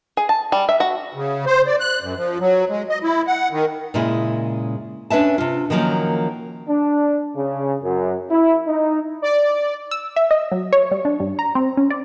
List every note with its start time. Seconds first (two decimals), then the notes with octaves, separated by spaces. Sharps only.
0.17 G#4
0.29 A5
0.52 G3
0.69 E5
0.80 F#4
1.14 C#3
1.46 C5
1.67 D5
1.80 F#6
2.02 F#2
2.17 F3
2.40 F#3
2.69 G#3
2.89 D#5
3.03 E4
3.27 F#5
3.51 D#3
3.94 A#2 C#3 G#3 E4
5.10 C#4 D4 B4 E5 A5
5.38 C3 F4
5.70 D#3 F3 F#3 A#3 C#4
6.69 D4
7.36 C#3
7.83 F#2
8.30 E4
8.67 D#4
9.22 D5
9.91 E6
10.16 E5
10.31 D#5
10.52 F#3
10.73 C#5
10.91 G3
11.05 D4
11.20 G2
11.39 A#5
11.55 C4
11.77 C#4
11.90 D5